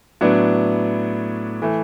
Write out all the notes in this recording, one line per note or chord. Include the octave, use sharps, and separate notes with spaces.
A2 F#3 B3 D4
E3 A3